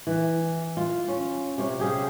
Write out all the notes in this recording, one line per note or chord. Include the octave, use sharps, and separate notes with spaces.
E3
F4
C#4
C3 C#4
G4 G#4 F5